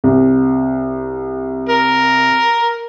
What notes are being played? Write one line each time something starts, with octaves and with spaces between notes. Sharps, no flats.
C2
A#4